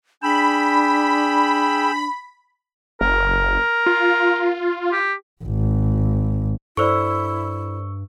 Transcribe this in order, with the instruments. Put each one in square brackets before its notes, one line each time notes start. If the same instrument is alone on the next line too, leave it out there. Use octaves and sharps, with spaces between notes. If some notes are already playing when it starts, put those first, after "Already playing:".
[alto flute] D4 [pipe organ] G#4 G5 E6 [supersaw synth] B5
[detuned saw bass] F#1 [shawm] A#4
[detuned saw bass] F4
[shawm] G4
[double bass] G#1
[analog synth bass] G2 [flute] E4 [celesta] A4 C5 D5 [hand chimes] C#6 E6